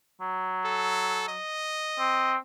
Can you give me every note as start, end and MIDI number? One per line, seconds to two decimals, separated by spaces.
0.21 1.38 54
0.65 1.26 69
1.29 2.37 75
1.99 2.37 60